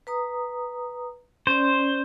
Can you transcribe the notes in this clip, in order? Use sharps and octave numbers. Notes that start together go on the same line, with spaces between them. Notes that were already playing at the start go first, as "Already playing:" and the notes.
B4 A#5 D#6
C#4 C5 D5